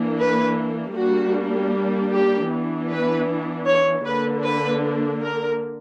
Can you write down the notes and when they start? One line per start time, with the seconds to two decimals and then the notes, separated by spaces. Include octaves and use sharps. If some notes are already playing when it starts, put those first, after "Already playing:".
Already playing: E3 A#3 D4
0.19 B4
0.96 G3 A#3 D4 F#4
2.12 G4
2.51 E3 B3 D4
2.90 B4
3.67 C#5
4.06 D3 A#3 D4 B4
4.44 B4
5.22 A#4